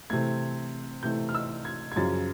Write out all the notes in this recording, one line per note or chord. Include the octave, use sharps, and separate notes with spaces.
C3 E3 A3 G#6
C3 E3 A3 G6
F6
E6
G#6
G#6
F#2 C#3 F3 A6